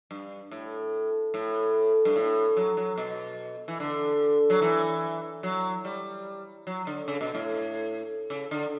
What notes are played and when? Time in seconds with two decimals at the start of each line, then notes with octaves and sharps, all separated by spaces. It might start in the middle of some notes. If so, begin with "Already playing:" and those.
0.11 G2
0.51 A2
1.34 A2
2.05 G2
2.16 A2
2.57 F#3
2.77 F#3
2.98 B2
3.68 E3
3.80 D3
4.50 F#3
4.62 E3
5.43 F#3
5.85 G3
6.67 F#3
6.87 D3
7.08 C#3
7.21 B2
7.35 A2
8.30 C#3
8.51 D3